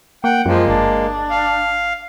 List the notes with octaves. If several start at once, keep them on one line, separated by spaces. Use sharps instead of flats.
A#3 F#5 G5
F#2 F3 G#3 A#3
G1 D4
F5